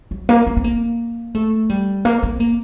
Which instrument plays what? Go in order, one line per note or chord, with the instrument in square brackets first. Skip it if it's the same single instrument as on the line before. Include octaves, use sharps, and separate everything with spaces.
[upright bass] F#3
A#3
A#3
C4
A#3
A3
G3
A#3
C4
A#3